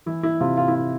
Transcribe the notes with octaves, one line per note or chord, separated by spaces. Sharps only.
E3 E4
E4
C3 F4
F4
E4
F4